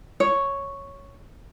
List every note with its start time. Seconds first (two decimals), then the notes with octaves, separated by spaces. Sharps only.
0.20 C#5